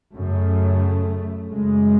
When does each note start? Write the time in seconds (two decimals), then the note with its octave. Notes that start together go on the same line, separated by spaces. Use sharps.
0.14 F#2 C#3 A3
1.49 F#2 C#3 G#3